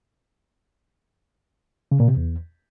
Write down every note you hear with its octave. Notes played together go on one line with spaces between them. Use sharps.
C#3
A#2
C3
E2